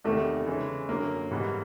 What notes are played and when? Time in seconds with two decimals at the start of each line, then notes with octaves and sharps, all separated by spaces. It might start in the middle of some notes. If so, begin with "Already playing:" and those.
0.04 E2 C3 D#3 A3
0.47 C#3 E3 G#3
0.89 F#2 D3 F#3 A#3
1.31 G#2 E3 G3 B3 D#4